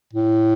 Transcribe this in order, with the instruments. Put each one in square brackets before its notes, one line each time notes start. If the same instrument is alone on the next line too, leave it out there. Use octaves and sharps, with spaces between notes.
[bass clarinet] A2